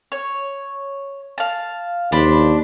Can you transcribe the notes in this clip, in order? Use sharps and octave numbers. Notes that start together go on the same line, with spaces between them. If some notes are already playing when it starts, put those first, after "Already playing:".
C#5
F5 A5
D#2 D4 C5 B5